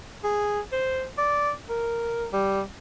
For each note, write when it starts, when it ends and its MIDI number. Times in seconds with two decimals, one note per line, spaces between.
0.24 0.60 68
0.72 1.05 72
1.18 1.52 74
1.69 2.27 70
2.33 2.61 55